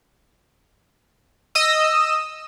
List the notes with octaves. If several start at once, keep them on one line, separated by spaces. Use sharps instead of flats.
D#5 D#6 E6